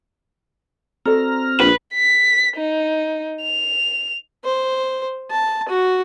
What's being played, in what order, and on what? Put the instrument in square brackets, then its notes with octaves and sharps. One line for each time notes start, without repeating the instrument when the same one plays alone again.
[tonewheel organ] C4 A#5 F6 [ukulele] F#4 A4 D5
[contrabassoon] A#1 [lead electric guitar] B4
[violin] B6
D#4
F7
[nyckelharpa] C5
A5
F#4